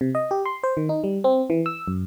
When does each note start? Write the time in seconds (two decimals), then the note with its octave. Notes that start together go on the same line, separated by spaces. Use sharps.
0.01 C3
0.15 D#5
0.31 G4
0.46 C6
0.63 C5
0.77 D#3
0.89 D#4
1.04 G3
1.24 C4
1.50 E3
1.66 E6
1.88 F#2